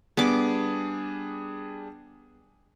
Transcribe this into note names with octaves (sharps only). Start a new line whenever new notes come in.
G3 B3 D4 G#4 D6